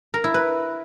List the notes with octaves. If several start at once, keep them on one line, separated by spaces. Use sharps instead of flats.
A#4
E4
B4